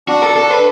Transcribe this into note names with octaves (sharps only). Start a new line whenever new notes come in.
D4 F#4
A4
A4
B4